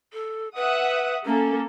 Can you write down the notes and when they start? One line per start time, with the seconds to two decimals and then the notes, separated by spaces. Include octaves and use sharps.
0.13 A4
0.56 B4 E5 F#5 D#6
1.25 A#3 C#4 A4